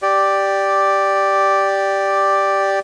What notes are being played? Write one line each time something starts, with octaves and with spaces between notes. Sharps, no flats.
G4 D5